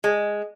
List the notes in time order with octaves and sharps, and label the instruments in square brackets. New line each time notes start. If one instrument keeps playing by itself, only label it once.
[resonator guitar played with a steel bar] G#3